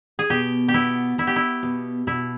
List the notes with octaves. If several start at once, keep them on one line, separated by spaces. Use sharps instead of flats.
G#4
B2 G4
G4
B3 E4
B3 E4
G4
E4
B2
B2 E4